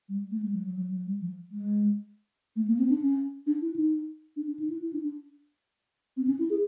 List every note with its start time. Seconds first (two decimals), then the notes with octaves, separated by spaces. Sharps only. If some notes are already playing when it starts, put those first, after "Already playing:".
0.09 G3
0.31 A3
0.43 G#3
0.53 F#3
0.65 F#3
0.76 F#3
0.91 F#3
1.06 G3
1.21 F3
1.51 G#3
2.56 A3
2.68 A#3
2.79 C4
2.90 D4
3.01 C#4
3.47 D4
3.61 E4
3.76 D#4
4.36 D4
4.47 D4
4.59 D#4
4.70 E4
4.82 E4
4.93 D4
5.03 D4
6.17 C4
6.27 C#4
6.39 E4
6.50 G#4